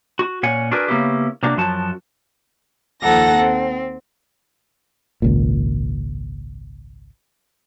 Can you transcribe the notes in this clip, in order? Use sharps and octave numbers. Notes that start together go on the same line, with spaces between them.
F#4
A#2 C#4 C#5 F#5 G#5
D4 F#4 G#4 A#4 B4
C#3 A#3 B3 C#4 E4 G4
C3 A#3 D4 F#4
F#2 F3 F#4 A5
D#2 F3 A4 F#5 A#5 A#6
C4
G#1 C#2 A#2